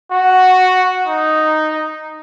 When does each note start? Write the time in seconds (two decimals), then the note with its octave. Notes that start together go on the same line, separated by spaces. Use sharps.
0.12 F#4
1.06 D#4